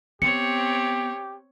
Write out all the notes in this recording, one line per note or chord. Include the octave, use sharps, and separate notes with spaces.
B3 C4 G4 C#5 C#7